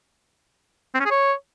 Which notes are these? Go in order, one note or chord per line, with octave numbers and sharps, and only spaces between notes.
C4
C#4
G#4
C#5